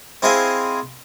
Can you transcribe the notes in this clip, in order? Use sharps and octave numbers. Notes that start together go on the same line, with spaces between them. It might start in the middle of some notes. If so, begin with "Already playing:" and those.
C4 E4 G#4 D#5 F5 G#5